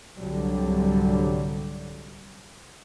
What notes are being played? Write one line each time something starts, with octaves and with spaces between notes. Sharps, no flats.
C2 G#2 D3 F#3 G3